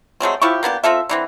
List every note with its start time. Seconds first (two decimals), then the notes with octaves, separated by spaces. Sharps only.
0.20 F#3 G#3 A3 C4
0.42 F3 E4 G4 C#6
0.63 A#3 B3 D4 G4
0.84 C4 F4 A4 E5
1.09 D3 E3 C4